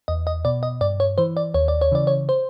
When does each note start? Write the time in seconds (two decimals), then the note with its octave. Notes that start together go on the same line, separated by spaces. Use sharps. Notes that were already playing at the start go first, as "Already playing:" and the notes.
0.08 E2 D#5
0.27 D#5
0.45 B2 D5
0.63 D#5
0.81 G2 D5
1.00 C#5
1.18 E3 C5
1.37 D5
1.54 D#2 C#5
1.68 D5
1.81 C#5
1.92 C#3 E3 D5
2.07 C#5
2.29 C5